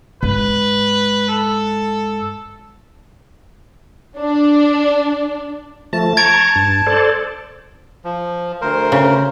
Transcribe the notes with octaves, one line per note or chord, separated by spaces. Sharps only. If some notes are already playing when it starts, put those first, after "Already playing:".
G#2 B4
A4
D4
F3 A3 A5
A#5 C#6 G#6 A6 D7
G2
A4 C5 D5
F3
D2 A#4 C5
C#3